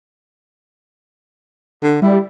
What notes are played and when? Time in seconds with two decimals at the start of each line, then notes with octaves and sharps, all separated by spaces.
1.83 D3
2.02 G3 E4